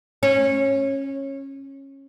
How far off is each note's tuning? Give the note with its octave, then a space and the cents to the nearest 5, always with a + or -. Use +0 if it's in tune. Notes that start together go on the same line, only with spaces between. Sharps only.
C#4 -20